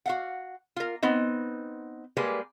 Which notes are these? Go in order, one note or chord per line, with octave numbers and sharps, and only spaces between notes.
F#4 F5 F#5
F4 A#4
B3 C4 D#4
G3 G#3 A#3 G#4 B4 G#5